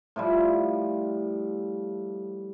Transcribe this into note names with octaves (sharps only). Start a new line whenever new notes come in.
A2 F3 G3